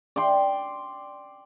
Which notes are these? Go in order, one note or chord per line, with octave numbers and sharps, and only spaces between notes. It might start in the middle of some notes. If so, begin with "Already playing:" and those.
D5 G5 C6